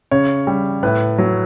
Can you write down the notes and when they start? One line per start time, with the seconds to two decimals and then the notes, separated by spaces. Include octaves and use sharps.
0.11 C#3 C#5
0.47 G3
0.83 A2 B4
1.18 F#3